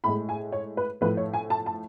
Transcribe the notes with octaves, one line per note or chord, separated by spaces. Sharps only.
A2 G#3 B5
G#5
C#5
B4
A2 F3 A3 B4
C#5
G#5
A5
A5